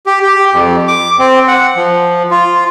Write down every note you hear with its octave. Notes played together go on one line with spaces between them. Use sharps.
G4
G4
F2
D6
C4
F#5
F3
F4